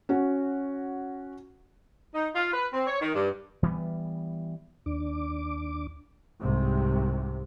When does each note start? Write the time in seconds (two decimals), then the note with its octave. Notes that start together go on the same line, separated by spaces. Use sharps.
0.09 C#4 F#4
2.15 D#4
2.35 F4
2.53 B4
2.73 C4
2.87 C#5
3.01 D#3
3.15 G2
3.63 E3 G3 A#3 B3
4.86 D#2 D4 D6
6.41 C2 G#2 C3